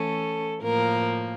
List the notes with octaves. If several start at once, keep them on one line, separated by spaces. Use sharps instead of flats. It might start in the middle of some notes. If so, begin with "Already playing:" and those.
Already playing: E3 A3 C#4 A4
A2 F3 A#3 A#4